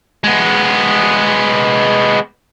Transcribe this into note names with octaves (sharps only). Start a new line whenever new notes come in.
G#3 B3